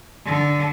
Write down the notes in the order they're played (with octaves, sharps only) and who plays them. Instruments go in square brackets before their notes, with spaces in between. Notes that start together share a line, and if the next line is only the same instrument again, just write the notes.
[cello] D3